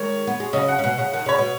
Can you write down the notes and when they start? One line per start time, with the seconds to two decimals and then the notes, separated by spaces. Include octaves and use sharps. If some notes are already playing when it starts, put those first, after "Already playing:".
Already playing: D#3 G#3 C#5
0.27 B3
0.40 G#3
0.53 C#3 F#3 D#5
0.68 F#5
0.79 C#3
0.84 B2 F#5
0.98 C#3 F#5
1.13 D#3 F#5
1.26 C#3 C#5
1.38 B2